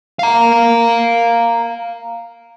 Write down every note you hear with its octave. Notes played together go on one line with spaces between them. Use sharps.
F5 A#5